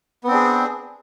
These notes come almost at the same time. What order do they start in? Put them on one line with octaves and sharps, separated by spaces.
B3 C4 D4 G#4